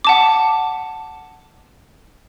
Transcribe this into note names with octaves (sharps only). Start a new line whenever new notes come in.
F#5 A5 D6